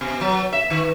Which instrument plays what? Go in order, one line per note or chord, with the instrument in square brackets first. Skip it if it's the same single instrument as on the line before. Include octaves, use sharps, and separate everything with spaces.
[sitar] B2
F#3
E5
D#3